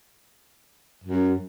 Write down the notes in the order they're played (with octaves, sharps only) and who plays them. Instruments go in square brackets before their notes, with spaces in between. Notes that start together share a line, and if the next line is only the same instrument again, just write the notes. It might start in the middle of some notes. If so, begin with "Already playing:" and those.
[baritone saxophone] F#2